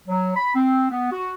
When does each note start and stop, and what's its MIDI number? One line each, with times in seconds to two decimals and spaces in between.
0.08 0.32 54
0.36 0.51 83
0.55 0.88 60
0.90 1.08 59
1.12 1.32 66